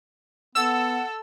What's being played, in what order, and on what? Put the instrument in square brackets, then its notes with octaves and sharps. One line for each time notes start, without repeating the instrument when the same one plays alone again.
[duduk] B3 [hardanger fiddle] A4 [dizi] F#5 [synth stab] E6